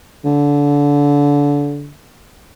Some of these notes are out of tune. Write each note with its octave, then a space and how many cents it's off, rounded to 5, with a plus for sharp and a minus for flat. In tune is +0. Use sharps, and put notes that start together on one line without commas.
D3 -25